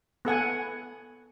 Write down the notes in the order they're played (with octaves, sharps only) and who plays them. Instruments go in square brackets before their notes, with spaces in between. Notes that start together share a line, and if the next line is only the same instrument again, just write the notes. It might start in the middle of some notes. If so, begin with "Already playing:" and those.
[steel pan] B3 A4 F#5 G#5